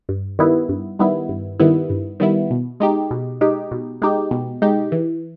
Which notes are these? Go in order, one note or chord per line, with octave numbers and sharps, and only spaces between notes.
G2
D#3 G3 B3 E4
G2
D#3 G3 B3 E4
G2
D#3 G3 B3 E4
G2
D#3 G3 B3 E4
B2
G#3 D#4 G4
B2
G#3 D#4 G4
B2
G#3 D#4 G4
B2
G#3 D#4 G4
E3